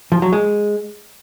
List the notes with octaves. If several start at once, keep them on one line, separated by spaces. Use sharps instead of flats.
F3
F#3
G#3